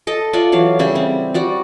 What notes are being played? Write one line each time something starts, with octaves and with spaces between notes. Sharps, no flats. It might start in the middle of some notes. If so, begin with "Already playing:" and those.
A4 D#5 A5
F4 D5 E5 F#5
E3 F#3 F5
C#3 G3 E5
C4
G3 F#4 D5